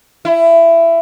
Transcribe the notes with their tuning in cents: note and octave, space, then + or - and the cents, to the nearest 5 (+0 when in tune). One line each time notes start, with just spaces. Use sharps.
E4 +20